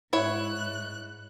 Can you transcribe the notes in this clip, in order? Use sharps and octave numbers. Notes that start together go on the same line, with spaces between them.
G#2 E4 C#5 F#6